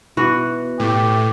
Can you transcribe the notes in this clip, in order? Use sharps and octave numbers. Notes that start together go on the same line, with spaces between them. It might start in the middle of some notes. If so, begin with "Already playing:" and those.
B2 E3 F#4
A2 G4